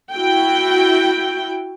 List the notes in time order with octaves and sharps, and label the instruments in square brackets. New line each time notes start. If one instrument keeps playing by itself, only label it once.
[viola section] E4 F#4 G5